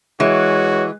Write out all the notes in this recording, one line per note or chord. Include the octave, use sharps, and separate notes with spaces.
E3 G#3 F#4 C#5